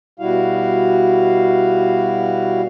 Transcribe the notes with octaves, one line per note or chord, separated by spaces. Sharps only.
B2 G3 E4 F#4 F5